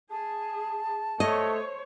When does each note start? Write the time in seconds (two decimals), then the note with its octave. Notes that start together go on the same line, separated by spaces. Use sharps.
0.11 G#4 A5
1.20 A3 C5 C#5 D#5